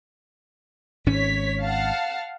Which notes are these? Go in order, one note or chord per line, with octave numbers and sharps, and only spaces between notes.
G#1 G#2 C#4 C#5 B6
F5 F#5 A5